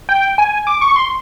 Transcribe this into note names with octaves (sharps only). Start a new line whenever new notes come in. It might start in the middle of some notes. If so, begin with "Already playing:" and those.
G5
G#5
D6
C#6
C6